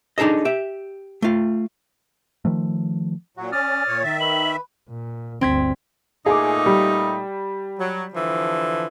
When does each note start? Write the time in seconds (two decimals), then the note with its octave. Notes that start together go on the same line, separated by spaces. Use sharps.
0.18 D4 D#4 G#4 A4 D#5
0.45 G4 E5
1.22 A3 F4
2.45 D#3 F3 A3
3.37 A#2 F#3 F#4
3.52 C#4 D5 D#6 F6 A6
3.87 A#2 C#5
4.03 D#3 E5
4.20 B4 F#7
4.90 A#2
5.41 G1 D2 C4 G#6 B6
6.26 A#2 A3 D#4 G#4 G#5 D6
6.66 G3
7.80 F#3
8.14 D3 E3 F3